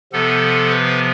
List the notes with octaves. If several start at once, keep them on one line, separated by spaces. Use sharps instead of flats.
C3 F3 B3 A4
B4